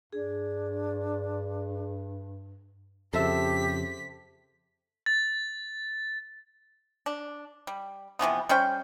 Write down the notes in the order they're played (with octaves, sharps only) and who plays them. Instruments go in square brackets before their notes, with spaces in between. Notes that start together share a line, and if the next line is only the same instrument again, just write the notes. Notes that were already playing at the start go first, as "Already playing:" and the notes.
[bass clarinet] G2 [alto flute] D4 [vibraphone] G#4
[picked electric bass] F2 C#3 [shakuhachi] G4 [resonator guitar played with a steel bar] A4 C5 E5 [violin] B6
[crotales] A6
[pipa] D4
G3
C3 E3 F3 B3
G3 C#4 C5 G5